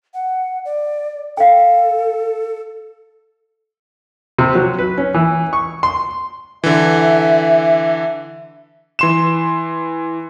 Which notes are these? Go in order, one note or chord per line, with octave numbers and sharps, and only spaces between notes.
F#5
D5
A4 F5 G5
C3
F#3
B4
C#4
E3
C#6
C6
D3 E3 E5
E3 C6 E7